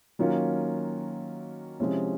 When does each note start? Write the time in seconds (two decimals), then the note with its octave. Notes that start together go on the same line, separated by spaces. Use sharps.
0.19 D#3 F#3 A#3 C#4 F4
1.79 C3 F3 G#3 C#4 E4